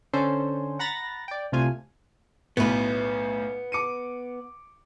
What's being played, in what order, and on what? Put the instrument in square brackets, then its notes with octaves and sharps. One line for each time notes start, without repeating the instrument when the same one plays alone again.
[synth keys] D3 C#4 A4 C5
F#5 A#5 B5 A6 A#6
D5 G5
C2 C3 A3 F4 G#5
[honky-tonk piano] B1 A2 [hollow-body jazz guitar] B3 B4
[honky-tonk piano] D6 C#7 D#7